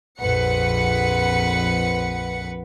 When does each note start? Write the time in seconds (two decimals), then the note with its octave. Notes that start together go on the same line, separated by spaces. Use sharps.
0.20 A#1 F2 B4 F#5 C#7